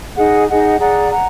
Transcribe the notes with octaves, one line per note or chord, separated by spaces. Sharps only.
D#4 G#4 D#5 F#5
D#4 G#4 D#5 F#5
G#4 D5 F#5 A#5
F#5 A#5